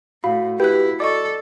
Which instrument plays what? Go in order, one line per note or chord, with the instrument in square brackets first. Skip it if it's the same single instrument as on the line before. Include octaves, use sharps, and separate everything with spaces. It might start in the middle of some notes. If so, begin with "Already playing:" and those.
[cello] A2 [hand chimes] F#4 [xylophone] F5 [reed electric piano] B5
[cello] E4 [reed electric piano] G4 B4 [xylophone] F#6 G6
[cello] A4 [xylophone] D5 D#5 C#6 [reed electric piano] D6